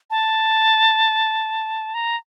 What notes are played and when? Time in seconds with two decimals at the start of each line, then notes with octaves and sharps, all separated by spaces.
0.11 A5
1.94 A#5